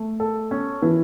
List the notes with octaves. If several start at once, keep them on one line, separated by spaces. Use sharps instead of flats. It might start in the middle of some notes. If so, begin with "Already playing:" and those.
Already playing: A3
A4
C#4
E3